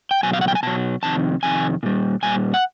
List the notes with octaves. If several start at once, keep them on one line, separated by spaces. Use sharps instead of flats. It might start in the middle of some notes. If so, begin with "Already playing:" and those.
G5
B2 F#3 G#5
F5
F#5
G5
G#5
B2 F#3 A5
F2 C3 D#3 A5
F2 C3 D#3 G#5
A#2 G3
A#2 G3 G#5
F#5